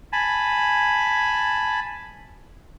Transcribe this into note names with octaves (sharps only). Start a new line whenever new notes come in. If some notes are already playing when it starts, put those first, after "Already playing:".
G#5 A5 B5